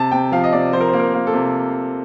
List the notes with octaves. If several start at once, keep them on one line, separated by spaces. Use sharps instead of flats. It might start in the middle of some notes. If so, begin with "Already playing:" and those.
Already playing: C3 A5
C3 G5
F3 F5
D#5
C3 D5
F3 C5
A#4
A#3 C5
A#4
A#3
A4
C3